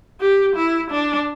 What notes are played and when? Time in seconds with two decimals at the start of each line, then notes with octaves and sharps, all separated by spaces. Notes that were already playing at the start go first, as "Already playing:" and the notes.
0.21 G4
0.56 E4
0.91 D4